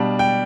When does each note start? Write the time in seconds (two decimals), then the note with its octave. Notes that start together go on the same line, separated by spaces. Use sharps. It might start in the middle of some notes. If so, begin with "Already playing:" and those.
Already playing: B2 G3 D4 F5 A5
0.19 G5